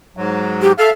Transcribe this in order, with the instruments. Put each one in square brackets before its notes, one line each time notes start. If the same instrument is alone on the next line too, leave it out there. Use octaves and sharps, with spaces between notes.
[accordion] G#2 F#3
[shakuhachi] G4
[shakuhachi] A4 [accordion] E5 F5 F6